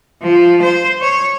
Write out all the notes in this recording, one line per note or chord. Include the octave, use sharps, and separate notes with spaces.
F3
C5
C#5